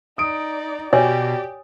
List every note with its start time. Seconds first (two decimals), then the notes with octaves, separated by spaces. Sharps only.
0.18 D#4 D5 D#6 D7
0.93 B2 G4 C#5 D5 G#5